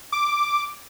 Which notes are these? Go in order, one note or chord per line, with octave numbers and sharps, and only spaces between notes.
D6